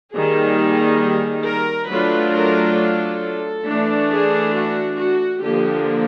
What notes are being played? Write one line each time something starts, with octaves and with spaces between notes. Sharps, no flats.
D#3 G3 A#3 D#4 G#4
A#4
F#3 A3 D4 F4 B4
A#4
A4
E3 A3 D4
G#4
F#4
F#4
D3 F3 A#3 G4